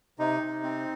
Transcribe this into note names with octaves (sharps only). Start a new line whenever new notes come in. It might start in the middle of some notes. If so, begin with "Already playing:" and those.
C3 D#4
C3
C4